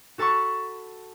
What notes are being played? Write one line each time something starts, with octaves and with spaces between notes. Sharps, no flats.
F#4 A4 A5 B5 C#6